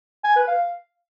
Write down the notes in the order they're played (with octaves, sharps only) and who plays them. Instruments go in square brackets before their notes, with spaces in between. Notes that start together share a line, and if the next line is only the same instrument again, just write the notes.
[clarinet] G#5
B4
F5